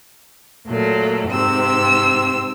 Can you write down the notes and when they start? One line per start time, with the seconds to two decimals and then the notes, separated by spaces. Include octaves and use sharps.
0.68 A#2 F#3 A3
1.29 G#2 C3 C4 E6